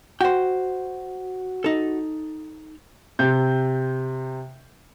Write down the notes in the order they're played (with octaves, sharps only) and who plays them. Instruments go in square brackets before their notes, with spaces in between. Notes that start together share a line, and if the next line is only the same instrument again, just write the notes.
[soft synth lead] F#4 [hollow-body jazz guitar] C5 G5
[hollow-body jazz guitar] D#4 A4
[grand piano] C3 G6